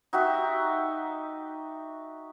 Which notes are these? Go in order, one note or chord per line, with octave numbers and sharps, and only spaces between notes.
D#4 F#4 G4 E5